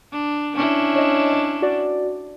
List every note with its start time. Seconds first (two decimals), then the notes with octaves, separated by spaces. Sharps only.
0.11 D4
0.54 C#4 D4 E4
0.96 C#5 D#5
1.62 F#4 D5